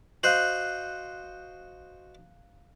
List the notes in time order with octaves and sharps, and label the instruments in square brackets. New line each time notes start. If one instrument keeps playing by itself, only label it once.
[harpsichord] F#4 C5 D#5 [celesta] F5 F#6 F#7